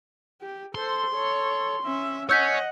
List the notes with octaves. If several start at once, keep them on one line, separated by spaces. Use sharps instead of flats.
G4
A4 C5 C6
A4 C#5
C#4 E5
C#5 D#5 F#5 G#5 E6 G6 B6